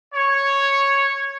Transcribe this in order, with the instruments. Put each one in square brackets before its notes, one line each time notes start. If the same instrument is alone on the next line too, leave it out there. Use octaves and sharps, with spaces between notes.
[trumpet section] C#5